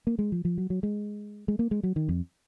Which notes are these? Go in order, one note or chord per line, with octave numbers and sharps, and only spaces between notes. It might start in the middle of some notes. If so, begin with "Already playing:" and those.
A#3
G#3
F3
F3
F#3
F#3
G#3
G#3
A#3
G#3
F#3
D#3
F2